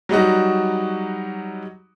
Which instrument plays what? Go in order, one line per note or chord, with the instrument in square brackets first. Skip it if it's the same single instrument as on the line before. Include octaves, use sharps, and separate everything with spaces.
[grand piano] F#3 G3 D#4 F#4